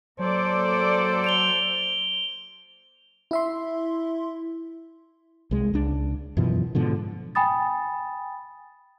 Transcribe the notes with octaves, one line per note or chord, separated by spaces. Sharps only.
F#3 A#3 A4 C5 D5
D7 F7 G7
E4 E5 C6
C2 G#3
C#2 D4
F#2 B2 E3 F3
G#2 B2 D3 F3
G5 G#5 B5 D#6 A6